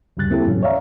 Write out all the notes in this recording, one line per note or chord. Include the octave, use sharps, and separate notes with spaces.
D2 G2 C#3 G3 F#6 A6
A#3 C4 E4 G4 A4
D#2 G#2 B2 E3 F#3 C#4
C#5 D5 E5 F5 A#5